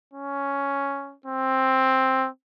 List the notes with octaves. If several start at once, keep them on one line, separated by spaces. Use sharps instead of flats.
C#4
C4